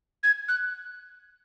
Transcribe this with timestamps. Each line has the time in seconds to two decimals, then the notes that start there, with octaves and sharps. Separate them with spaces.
0.23 G#6
0.48 F#6